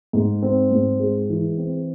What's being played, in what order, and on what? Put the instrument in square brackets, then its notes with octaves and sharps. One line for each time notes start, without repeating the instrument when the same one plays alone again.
[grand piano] G#2
C4
G#2
G#3
E3
C4